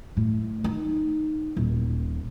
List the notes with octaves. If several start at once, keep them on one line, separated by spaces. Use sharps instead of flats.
A2
D#4
D#1